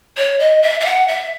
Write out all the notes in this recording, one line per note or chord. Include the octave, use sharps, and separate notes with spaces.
C#5
D#5
E5
E5
F#5
E5